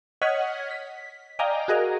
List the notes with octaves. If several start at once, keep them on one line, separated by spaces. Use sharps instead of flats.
C#5 D#5 F#5 F6 G#6 B6
B6
D5 D#5 F5 G5 G#5 A#5
F#4 G#4 A#4 D#5 F5